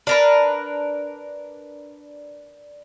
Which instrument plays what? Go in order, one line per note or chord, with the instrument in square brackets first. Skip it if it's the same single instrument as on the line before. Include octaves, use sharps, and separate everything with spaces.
[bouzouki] D4 A#4 B4